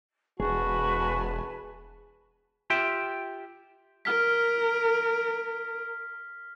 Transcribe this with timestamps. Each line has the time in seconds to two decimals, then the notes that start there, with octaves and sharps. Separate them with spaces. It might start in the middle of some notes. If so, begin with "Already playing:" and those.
0.40 E1 F#4 G#4 B4 G#5 A5
2.70 F4 G4 E5 G5
4.05 A#4 F6 B6